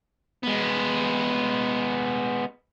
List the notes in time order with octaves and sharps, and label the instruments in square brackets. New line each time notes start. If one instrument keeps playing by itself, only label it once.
[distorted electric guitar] G#3 B3